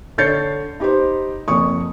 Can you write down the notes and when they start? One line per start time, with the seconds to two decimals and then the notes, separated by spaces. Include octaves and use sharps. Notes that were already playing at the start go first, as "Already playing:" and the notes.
0.18 D3 C#5 G6 A6 C7 C#7
0.80 D#4 G4 B4 C5
1.48 F#1 F2 C#6 D#6